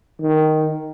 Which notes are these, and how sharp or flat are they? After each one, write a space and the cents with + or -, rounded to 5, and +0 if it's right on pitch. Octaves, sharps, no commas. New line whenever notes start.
D#3 +0